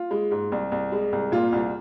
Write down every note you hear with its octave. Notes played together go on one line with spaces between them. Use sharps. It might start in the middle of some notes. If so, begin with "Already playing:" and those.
Already playing: F4
G#3
G#2
C2
C2
G#3
C2
A#2 F4
C2